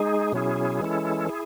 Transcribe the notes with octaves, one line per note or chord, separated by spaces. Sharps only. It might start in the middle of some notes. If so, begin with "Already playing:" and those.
Already playing: G#3 D#4 G#4
B2 F#3 C#4 E4 G#4
E3 G#3 C#4 E4 A4
E4 G#4